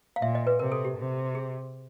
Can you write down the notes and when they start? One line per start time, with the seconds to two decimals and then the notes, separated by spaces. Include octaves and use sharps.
0.16 F5
0.22 A#2 E5
0.35 D#5
0.47 B4
0.59 C3 A#4
0.72 A4
0.85 G4
0.97 C3
1.35 G#4